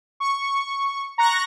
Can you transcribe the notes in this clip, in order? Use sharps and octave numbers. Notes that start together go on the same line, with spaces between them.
C#6
A#5 C#6 F#6 A#6